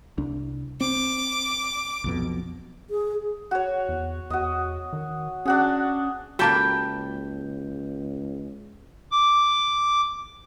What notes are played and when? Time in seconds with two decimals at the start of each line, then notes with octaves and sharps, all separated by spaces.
0.18 C2 D4
0.81 C4 D6
2.04 B1 F2 B2
2.90 G#4
3.51 F#4 C#5
3.89 E2
4.30 E2 F#4 D#5
4.93 D#3
5.45 C#4 D4 F#4 G#4
6.39 C#2 A#3 F#4 G4 A4 G5 A5 B5
9.12 D6